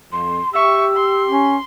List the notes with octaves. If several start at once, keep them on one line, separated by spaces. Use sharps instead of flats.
F2 C6
G4 E5 C#6 E6
C6
C#4